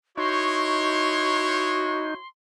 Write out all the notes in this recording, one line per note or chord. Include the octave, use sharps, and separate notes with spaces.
D#4 E4 F#4 C#5 C6